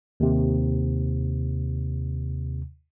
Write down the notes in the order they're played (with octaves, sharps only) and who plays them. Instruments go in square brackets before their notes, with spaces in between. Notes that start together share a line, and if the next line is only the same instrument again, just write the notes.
[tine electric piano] D#2 C3